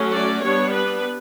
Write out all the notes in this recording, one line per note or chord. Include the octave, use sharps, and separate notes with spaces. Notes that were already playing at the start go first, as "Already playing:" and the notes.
Already playing: F#3 A3 C#4
D5
G3 B3 D4 C#5
B4